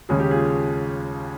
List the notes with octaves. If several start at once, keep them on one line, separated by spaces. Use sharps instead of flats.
D#2 C#3 G#3 C#4 G#4
G4
F4 G#4